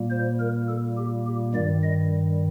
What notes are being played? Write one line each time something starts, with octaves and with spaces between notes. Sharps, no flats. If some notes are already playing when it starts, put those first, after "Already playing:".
Already playing: A#2 G3 A#3
C5
A#4
A4
G4
G4
G2 D#3 G3 D5
D#5